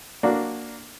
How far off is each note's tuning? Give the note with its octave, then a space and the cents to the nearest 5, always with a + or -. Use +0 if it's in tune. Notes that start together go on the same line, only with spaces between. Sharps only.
A#3 +0 D4 +0 F#4 +0